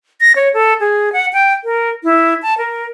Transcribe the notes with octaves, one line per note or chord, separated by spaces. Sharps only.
A#6
C#5
A4
G#4
F#5
G5
A#4
E4
A5
A#4